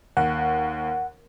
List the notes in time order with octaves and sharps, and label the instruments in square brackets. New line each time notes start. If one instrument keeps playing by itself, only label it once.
[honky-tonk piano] D#2 [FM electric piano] F#5